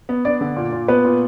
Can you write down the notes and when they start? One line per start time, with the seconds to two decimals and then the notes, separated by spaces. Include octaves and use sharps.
0.09 B3
0.25 B3 D4 D5
0.41 D3
0.56 A#2
0.72 A#2
0.88 B3 B4
1.05 A#2